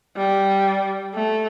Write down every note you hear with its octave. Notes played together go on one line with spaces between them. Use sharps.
G3
A3